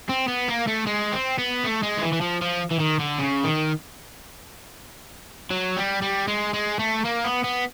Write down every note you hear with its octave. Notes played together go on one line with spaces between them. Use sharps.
C4
B3
A#3
A3
G#3
C4
B3
A3
G#3
D#3
E3
E3
F3
F3
E3
D#3
D3
C#3
D#3
F#3
G3
G3
G#3
G#3
A3
A#3
B3
B3